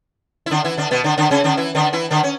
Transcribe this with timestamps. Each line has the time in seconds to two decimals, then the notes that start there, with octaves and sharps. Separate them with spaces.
0.46 E4
0.51 D3 D4
0.65 E3 E4
0.78 D3 D4
0.91 B2 B3
1.04 D3 D4
1.18 D3 D4
1.31 C#3 C#4
1.44 D3 D4
1.57 E3 E4
1.75 D3 D4
1.93 E3 E4
2.11 D3 D4
2.23 C#4